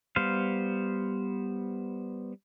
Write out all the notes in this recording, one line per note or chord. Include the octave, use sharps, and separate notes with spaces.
G3 B3 C5 F5